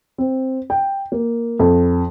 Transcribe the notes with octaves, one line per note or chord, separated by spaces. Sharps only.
C4
G5
A#3
F2